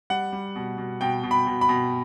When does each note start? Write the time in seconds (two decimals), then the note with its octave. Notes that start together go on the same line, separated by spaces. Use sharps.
0.10 G3 F#5
0.32 G3
0.55 B2
0.78 B2
1.01 B2 G5
1.23 B2
1.31 B5
1.46 B2
1.61 B5
1.69 B2